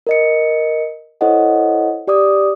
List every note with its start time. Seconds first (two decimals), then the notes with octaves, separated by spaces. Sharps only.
0.07 A#4 D#5 C#7
1.21 E4 A4 C5 C#5 D#5 F#5
2.07 G4 D5 D6 D#6